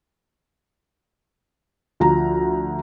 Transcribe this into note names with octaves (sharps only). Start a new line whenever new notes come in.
D2 F3 A#5